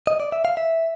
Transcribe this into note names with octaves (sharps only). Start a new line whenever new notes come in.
D#5
D5
E5
F5
E5